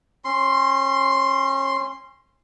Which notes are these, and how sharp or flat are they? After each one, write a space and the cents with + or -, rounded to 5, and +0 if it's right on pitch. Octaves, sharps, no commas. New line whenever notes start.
C#4 -30 C6 +0